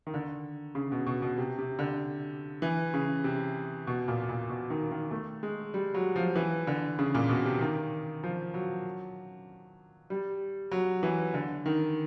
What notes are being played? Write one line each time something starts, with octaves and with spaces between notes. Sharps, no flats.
D#3
D3
C#3
B2
B2
B2
C3
C3
D3
E3
C#3
C3
B2
A#2
A#2
B2
D#3
D#3
A3
G#3
G3
F#3
F3
E3
D3
C#3
A#2
B2
C3
D#3
F3
F#3
G3
F#3
E3
D3
D#3